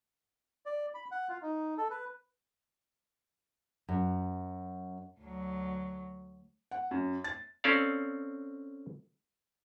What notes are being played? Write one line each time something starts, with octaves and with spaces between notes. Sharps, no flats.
D5
B5
F#5
F4
D#4
A4
B4
F#2
D2 F#3
F#5
F#2
A6
C4 C#4 A4 D5 F5